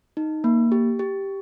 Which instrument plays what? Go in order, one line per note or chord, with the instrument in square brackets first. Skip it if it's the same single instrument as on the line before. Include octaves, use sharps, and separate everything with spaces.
[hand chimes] D#4
A#3
G4
G4